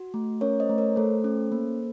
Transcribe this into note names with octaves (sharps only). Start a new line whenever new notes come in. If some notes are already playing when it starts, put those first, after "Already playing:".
Already playing: F#4
A3
C#4 A#4 C#5
C5 D#5
A3
A#4 C#5
A3 A4 C5
C#4
A#3